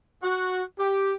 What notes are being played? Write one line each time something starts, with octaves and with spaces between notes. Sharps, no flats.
F#4
G4